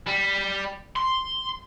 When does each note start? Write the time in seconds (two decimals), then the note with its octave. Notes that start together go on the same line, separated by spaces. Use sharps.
0.07 G3
0.96 C6